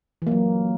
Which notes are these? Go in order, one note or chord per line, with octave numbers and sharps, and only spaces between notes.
E3 F#3 A#3